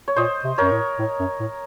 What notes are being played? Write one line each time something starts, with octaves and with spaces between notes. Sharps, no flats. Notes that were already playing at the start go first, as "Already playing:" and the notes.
C#5
A#2 C5 D#5
C3
F#2 A#4 C#5
A2
A2
F#2
A2